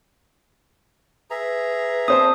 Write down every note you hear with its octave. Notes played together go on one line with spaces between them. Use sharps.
G#4 B4 E5 A#5
C4 C5 A5 D#6